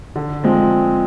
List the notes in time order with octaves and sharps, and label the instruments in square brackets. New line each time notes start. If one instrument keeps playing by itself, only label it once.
[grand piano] D3
F3 G#3 C4